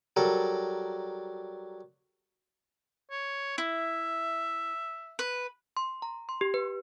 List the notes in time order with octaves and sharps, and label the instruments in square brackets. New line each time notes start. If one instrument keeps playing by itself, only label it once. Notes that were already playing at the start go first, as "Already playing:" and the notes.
[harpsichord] F#3 G3 A4 A#4
[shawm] C#5
[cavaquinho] E4 [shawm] E5
[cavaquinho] B4
[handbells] C6
A#5
C6
G4
B4